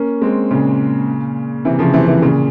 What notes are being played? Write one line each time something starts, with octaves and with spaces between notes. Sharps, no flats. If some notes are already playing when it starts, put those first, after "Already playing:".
Already playing: A#3 C#4
G#3 C4
A#2 C#3
C3 E3
C#3 F3
C3 E3
C3 E3
A#2 C#3